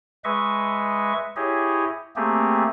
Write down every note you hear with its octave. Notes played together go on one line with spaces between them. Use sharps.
G#3 B4 D#5 E5 C#6
E4 G4 G#4 C#5 D#5
A3 A#3 C4 G4 G#4